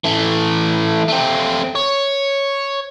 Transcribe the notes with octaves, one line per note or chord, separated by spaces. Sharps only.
E3 A3
A3 C4
C#5